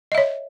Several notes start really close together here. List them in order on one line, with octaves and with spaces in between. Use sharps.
D#5 E5 C#5